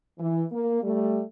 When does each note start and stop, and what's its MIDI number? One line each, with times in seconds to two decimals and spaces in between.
0.19 0.44 52
0.52 0.80 58
0.83 1.22 55
0.83 1.22 57